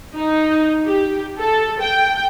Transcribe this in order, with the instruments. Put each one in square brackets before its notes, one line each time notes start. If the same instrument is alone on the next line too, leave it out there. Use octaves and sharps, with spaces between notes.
[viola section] D#4
G4
A4
G5